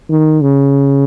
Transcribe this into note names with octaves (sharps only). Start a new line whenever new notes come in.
D#3
C#3